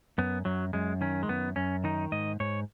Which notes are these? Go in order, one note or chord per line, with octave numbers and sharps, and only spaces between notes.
F#2 B3
F#2 F#3
F#2 G#3
D#3 C#4
G#3
F#2 B3
F#2 C#4
D#3 D#4
G#2 D#5
G#2 C#5